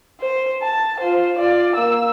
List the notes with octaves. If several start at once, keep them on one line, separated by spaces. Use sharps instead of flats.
C5
A5
F4 C5
F4 D5
A#3 E6